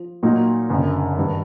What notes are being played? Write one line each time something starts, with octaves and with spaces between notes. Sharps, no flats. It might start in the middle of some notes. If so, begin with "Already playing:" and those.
Already playing: F3
A#2 F#3 A#3 D#4
F#1 F#2 D3
G2 D#3